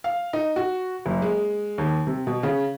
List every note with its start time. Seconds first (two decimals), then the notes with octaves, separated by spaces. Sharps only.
0.04 F5
0.33 D#4
0.56 F#4
1.06 F#1
1.22 G#3
1.78 D#2
2.07 C3
2.27 B2
2.43 C#3